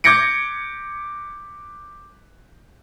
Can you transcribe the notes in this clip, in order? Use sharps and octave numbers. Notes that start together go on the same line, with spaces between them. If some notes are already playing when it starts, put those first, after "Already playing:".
D6 G6 G#6 A#6 C#7 D7